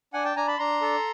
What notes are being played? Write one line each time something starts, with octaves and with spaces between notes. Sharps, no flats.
D4 F#5 G#5
G5 A5
D4 G#5 A#5
A5 B5
D4 A#5 C6
A4